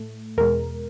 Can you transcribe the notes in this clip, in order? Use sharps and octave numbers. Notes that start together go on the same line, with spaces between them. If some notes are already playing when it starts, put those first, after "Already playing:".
Already playing: A2 A3
E2 B2 G#3 A#4